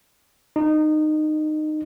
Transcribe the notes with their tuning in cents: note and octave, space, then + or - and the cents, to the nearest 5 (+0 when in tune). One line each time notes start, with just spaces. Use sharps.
D#4 -20